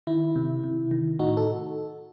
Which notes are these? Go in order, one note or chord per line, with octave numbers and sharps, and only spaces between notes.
D#3 E4
C3
C3
D#3
A2 D#4 F#4
A4